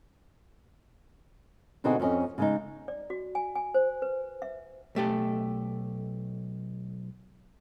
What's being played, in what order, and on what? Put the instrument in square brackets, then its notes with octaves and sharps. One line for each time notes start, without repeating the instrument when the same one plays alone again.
[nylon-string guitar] B2 D3 C4 D#4 F#4 G#4
F2 C4 C#4 D#5
C#3 G#3 D#4
[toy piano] D5
F#4
G#5
G#5
C5
B4
E5
[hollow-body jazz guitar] B1 A3 G4 A4